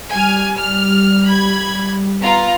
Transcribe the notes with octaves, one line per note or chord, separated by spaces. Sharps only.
G3 G#5 F6
F6
B5 G#6
B3 F4 A#5